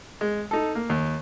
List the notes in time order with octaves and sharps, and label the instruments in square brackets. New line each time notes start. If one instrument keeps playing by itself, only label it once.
[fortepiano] G#3
D#4 A4
A#3
D#2